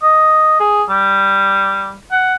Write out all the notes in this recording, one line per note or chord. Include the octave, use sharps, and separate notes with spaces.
D#5
G#4
G3
F#5